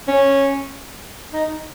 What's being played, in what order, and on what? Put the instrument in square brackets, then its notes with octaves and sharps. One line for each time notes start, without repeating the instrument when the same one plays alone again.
[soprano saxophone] C#4
D#4